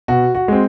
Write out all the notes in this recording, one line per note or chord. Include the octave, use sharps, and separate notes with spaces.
B2 F#4
F#4
G#3 C4